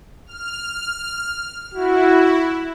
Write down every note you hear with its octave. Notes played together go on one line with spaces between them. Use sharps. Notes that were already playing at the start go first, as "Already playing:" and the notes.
F6
E4 F#4